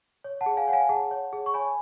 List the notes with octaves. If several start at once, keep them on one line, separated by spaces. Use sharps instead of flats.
C#5
F#5 A5
G#4
F5 G#5
C#5 F#5
F5 G#5
G#4 F#5 A5
C#5
G#4
C#6
C#5 G#5 B5